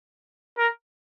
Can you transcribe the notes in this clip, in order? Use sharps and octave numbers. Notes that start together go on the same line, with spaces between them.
A#4